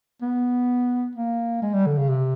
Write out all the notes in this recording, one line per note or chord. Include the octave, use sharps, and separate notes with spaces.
B3
A#3
G#3
G3
D3
C#3
C3